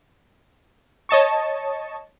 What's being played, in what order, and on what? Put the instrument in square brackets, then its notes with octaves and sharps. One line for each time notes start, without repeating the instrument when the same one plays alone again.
[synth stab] C#5 D#5 A5 C#6